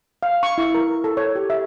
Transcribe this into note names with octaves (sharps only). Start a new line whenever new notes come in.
F5
C#6
E4
A#4
A4
C#5
G4
E5